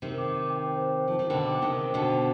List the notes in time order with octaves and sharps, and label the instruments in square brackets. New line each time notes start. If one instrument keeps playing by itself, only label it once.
[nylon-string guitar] C3 D#3 [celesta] C5
[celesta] D6
D6
G5
C5
C5
C5
[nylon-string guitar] F3
[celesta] C5
[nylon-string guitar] D#3
[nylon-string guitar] B2 D3 [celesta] G5
[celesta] D6
[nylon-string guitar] C3 D#3 [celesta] G5
[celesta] C5
[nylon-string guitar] B2 D3 [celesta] C5
[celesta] C5